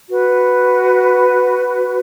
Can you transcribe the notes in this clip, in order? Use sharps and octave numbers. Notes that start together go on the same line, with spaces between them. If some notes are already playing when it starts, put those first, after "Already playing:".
F#4 B4